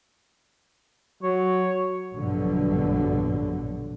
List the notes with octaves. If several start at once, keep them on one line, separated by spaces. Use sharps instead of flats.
F#3 C#5
A#1 G2 B2 D3 F#3